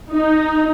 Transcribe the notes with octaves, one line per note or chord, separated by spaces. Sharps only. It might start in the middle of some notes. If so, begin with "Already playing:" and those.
D#4